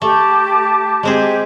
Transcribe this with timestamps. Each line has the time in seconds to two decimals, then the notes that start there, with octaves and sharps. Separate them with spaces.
0.02 A3 G4 A5 D6
1.03 G#3 C4 G4 G#4